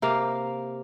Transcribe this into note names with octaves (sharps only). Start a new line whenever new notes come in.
C3 A#3 F5